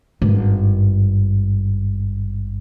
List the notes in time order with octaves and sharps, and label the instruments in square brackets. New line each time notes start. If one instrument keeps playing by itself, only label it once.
[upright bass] G#1 G2